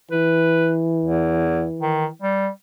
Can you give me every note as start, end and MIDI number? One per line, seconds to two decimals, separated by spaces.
0.11 2.14 52
0.11 0.71 71
1.04 1.64 40
1.81 2.06 51
2.22 2.49 55